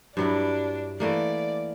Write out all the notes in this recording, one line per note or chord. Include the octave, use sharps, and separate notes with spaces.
G2 F#3 D4 E4
E3 A3 A#3 D5